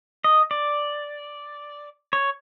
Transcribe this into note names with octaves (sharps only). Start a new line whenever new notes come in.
D#5
D5
C#5